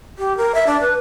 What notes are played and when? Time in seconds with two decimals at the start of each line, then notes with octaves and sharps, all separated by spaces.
0.19 G4
0.37 A#4
0.55 E5
0.67 D4
0.81 B4